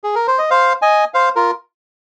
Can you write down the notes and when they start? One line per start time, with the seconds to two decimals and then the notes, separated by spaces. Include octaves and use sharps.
0.04 G#4
0.15 A#4
0.27 C5
0.38 D#5
0.50 C5 F5
0.82 D#5 G#5
1.14 C5 F5
1.36 F4 A#4